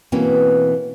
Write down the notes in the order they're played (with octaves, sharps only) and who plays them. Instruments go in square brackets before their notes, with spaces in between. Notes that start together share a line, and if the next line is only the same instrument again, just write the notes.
[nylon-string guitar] B2 E3 A#3 C4 C#4